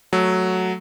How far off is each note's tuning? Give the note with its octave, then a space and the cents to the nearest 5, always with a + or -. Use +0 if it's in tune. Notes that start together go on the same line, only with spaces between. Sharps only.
F#3 +0 A3 +0 A4 +0